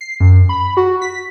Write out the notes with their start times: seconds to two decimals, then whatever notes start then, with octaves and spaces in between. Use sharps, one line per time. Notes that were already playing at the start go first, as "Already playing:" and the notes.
0.01 C7
0.20 F#2
0.49 B5
0.77 F#4
1.02 B6